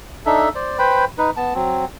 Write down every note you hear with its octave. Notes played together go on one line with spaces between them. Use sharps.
D4 D#4 A4 E5
C5 D5
B4 C5 G5 B5
D#4 B4
B3 A5
F#3 C4